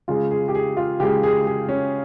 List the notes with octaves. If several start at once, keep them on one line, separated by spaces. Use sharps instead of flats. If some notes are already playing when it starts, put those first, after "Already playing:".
C#3 G#3 F4
G#4
G4
G#4
F4
C#3 G#3 G4
G#4
G#4
C#4